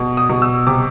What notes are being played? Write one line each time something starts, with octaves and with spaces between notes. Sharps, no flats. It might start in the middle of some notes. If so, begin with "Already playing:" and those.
Already playing: B2
D#6
B2
E6
C3 D6